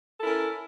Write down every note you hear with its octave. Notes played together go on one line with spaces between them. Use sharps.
C#4 E4 A4 A#4